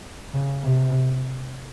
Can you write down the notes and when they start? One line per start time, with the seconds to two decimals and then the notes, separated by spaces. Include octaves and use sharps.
0.34 C#3
0.63 C3